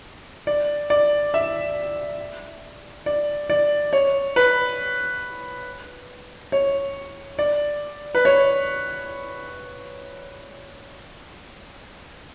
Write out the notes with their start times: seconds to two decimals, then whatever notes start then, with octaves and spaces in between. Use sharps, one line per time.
0.47 D5
0.90 D5
1.34 E5
3.06 D5
3.50 D5
3.93 C#5
4.36 B4
6.52 C#5
7.39 D5
8.15 B4
8.25 C#5